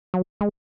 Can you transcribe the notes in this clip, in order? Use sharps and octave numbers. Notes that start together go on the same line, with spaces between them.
F#3
G#3